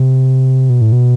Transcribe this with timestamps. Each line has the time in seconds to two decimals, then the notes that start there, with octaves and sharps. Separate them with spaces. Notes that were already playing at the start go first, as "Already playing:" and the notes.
Already playing: C3
0.69 B2
0.81 A2
0.92 B2